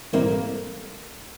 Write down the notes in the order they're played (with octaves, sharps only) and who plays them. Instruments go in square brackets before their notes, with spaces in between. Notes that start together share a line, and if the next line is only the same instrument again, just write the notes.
[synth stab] G#2 E3 G3 C4 E4 [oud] A#3